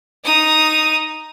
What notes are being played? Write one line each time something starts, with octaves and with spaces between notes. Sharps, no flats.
D#4 D#6